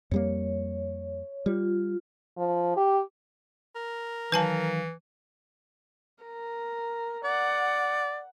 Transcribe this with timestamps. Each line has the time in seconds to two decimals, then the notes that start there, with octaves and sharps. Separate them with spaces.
0.11 F2 G3 A#3 C#5
1.46 G3 F4
2.38 F3
2.77 G4
3.75 A#4
4.32 D#3 E3 F#3 B4 F5 G#5 A5
6.24 A#4
7.25 D5 F#5